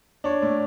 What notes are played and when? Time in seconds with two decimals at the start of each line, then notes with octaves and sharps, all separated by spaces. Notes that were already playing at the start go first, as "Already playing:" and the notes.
0.24 D4 C#5
0.42 A2